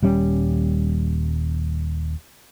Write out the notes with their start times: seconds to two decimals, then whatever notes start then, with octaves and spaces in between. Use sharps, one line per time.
0.03 D#1 G3 C#4